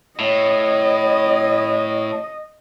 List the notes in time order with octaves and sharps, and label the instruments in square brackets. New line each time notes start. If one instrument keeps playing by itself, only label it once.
[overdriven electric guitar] A2 [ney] C#5 [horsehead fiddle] D#5